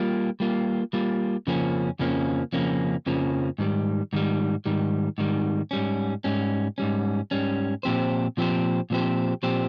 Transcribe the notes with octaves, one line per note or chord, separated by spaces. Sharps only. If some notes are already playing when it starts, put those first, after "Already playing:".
Already playing: G3 A#3 F4
G3 A#3 F4
G3 A#3 F4
F2 C#3 F3 A#3 C#4
F2 C#3 F3 A#3 C#4
F2 C#3 F3 A#3 C#4
F2 C#3 F3 A#3 C#4
G#2 D#3 G3
G#2 D#3 G3
G#2 D#3 G3
G#2 D#3 G3
G#2 G3 C#4
G#2 G3 C#4
G#2 G3 C#4
G#2 G3 C#4
A#2 F3 C4 G4 C5
A#2 F3 C4 G4 C5
A#2 F3 C4 G4 C5
A#2 F3 C4 G4 C5